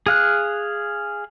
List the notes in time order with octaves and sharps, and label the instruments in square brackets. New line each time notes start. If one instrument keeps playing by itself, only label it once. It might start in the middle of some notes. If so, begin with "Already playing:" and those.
[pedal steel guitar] G#4 F5 F#6